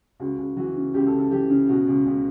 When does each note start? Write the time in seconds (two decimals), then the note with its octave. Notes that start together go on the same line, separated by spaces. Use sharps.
0.20 C#2 F#4
0.38 C#2
0.57 E3 F#4
0.76 C#3
0.94 C#2 G4
1.07 A4
1.13 C#2
1.19 A4
1.31 E3 G4
1.50 C#3
1.69 B2 F#4
1.87 C#2
2.06 C#2